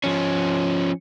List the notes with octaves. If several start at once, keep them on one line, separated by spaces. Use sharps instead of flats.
F3 C#4